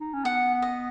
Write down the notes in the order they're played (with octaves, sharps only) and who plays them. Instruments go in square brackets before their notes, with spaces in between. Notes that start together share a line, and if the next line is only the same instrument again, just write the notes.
[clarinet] D#4
C#4
[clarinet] B3 [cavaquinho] F#5
[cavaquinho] D#5